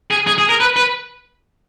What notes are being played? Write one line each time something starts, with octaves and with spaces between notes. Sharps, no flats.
G#4
G#4
G#4
A#4
B4
B4